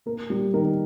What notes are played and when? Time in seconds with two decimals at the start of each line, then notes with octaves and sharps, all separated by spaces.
0.06 A#3 A#4
0.30 G3
0.53 D#3 A#4